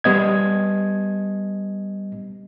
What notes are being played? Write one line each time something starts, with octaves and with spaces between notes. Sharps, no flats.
G3 B3 D#5 G#6